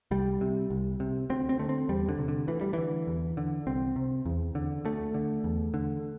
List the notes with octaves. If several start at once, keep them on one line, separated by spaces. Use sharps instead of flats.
C2 G3
C3
C2
C3
D2 C4
C4
D3 A3
C4
E2 G3
D3
C3
D3
D2 E3
G3
D3 E3
E2
D3
C2 C4
C3
E2
D3
D2 A3
D3
E2
D3